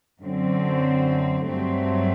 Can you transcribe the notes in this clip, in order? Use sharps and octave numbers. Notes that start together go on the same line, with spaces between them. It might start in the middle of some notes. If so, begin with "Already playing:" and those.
F#2 D3 F#3 C4
G2 F#3 A3 C4